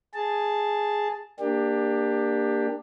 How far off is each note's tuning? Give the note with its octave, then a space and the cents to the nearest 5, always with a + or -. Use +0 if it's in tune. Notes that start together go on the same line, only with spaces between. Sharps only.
G#4 +0 A5 +0
A#3 +0 D4 +15 G4 +20